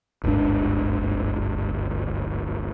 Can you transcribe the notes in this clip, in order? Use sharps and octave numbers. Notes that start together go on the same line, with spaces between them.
D1 G1 G#2 D4